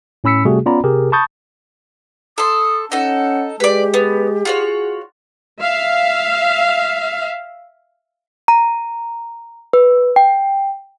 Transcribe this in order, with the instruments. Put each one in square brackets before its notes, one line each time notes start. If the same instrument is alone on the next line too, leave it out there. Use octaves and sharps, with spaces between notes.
[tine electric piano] A2 C#4 B5 E6 B6 C#7
C3 G3 A3 F#4 G#4
B3 C#4 F4 D5 A#5 B5
C3 G4 G#4 A#4
A5 B5 C#6 D#6 G6 A6
[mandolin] A4 C6 [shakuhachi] D#6
[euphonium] C#4 [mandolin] D#4 A4 [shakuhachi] F#5
[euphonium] G#3 [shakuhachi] G4 [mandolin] B4 D5
[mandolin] B3
[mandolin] F4 F#4 C#5 [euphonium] G#4
[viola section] E5 F5
[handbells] A#5
B4
G5